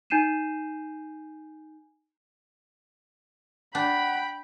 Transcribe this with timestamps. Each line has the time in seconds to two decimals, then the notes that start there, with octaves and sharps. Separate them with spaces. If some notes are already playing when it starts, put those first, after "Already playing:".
0.10 D#4 G#5 G6 C7 D#7 E7
3.75 D4 F#5 G5 B5